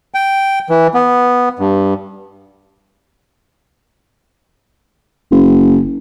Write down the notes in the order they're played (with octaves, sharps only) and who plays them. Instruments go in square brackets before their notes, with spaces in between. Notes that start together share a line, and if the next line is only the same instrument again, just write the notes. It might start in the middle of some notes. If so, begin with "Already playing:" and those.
[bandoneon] G5
E3
B3
G2
[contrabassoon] F#1